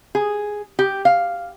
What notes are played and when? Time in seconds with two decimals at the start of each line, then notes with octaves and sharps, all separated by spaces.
0.15 G#4
0.79 G4
1.05 F5